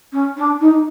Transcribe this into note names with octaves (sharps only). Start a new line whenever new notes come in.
C#4
D4
D#4